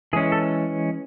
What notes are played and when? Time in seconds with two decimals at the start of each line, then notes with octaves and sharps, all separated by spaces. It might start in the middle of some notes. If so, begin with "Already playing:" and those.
0.13 E3 G#3 C#4 G#4
0.32 A4